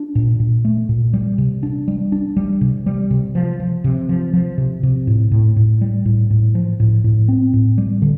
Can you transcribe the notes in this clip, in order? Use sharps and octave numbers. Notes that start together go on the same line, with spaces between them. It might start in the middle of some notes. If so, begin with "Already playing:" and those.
Already playing: D4
A#2
A#2
A3
A#2
G3
C3
D4
G3
D4
G3
C3
G3
C3
F3
F3
C3
F3
F3
C3
C3
A2
A2
A2
G3
A2
A2
F3
A2
A2
C4
A2
G3
D3